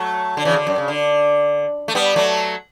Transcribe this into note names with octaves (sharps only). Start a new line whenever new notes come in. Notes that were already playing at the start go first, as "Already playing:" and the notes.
Already playing: F#3 A3
D3
C#3 E3
D3
F#2
C#3
D3
A3
G3 B3
F#3 A3